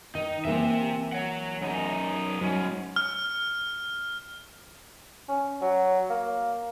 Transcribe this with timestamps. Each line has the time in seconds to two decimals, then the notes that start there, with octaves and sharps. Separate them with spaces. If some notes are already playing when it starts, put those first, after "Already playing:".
0.15 D#3 D#4
0.45 E3 A#3 C4 E5
1.13 C#5 F#5
1.62 F#2 D#4
2.41 G#2 F#3 C#4
2.96 F6
5.29 C#4
5.61 F#3
6.10 A#3